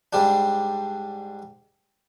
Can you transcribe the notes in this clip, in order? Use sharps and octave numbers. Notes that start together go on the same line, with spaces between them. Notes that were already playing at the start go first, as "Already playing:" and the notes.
G#2 G3 D4